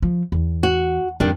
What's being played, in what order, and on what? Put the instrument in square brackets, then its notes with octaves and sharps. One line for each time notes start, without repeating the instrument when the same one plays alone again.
[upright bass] F3
E2
[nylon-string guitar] F#4
[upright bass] F2 [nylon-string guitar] D#3 G3 D4